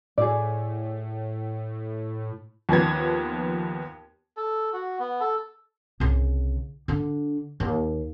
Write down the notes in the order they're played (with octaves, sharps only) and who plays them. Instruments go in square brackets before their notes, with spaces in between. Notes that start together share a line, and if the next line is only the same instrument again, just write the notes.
[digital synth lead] A2 [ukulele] G#4 D5
[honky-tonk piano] D#2 F3 B3 G#6
[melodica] A4
F#4
B3
A4
[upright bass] C2 C#3
D3 D4
D#2